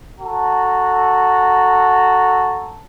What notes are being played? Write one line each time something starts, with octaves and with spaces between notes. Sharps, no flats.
F#4 A4 A#5